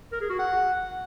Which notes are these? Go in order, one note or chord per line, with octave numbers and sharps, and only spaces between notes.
A#4
G#4
F#4
F#5